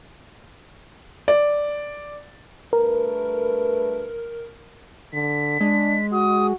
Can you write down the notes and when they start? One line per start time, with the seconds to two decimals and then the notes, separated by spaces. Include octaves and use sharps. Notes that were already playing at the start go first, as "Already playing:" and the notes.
1.28 D5
2.73 G2 A3 A#4 B4
5.13 D3 B6
5.61 G#3 D4
6.12 F#4 D#6